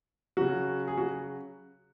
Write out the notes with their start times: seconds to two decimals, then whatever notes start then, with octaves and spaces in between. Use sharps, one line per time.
0.37 C#3 F#3 F#4
0.88 G#4
0.97 F#4